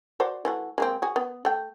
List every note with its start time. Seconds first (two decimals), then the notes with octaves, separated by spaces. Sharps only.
0.20 F#4 C5 D5
0.45 E3 A3 F#4
0.78 G#3 A#3 C4
1.02 F#4 G#4
1.16 B3
1.45 A3 G5